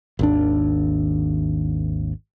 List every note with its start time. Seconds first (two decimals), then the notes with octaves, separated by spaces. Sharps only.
0.19 G#1 D#2 D4